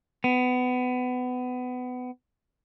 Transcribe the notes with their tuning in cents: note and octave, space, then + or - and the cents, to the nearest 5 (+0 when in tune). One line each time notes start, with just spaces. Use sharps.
B3 +25